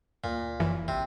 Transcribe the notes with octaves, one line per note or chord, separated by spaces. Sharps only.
D2 A#2
F#1 F#2 E3
A1 C3